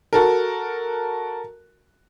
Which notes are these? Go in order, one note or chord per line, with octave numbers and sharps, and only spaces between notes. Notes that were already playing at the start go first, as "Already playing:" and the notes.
F#4 A4 A#4